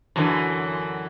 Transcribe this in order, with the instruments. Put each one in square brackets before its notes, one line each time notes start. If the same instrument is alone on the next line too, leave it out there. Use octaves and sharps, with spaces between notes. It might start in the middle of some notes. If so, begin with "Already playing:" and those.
[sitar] F#2 D3 E3